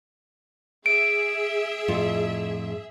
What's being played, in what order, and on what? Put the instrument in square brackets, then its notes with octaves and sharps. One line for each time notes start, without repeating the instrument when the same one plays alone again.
[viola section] G#4 E5 [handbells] D7
[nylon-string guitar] F2 A2 F4